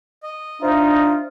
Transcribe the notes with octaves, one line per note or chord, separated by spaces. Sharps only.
D#5
D4 D#4 F4 C5 E5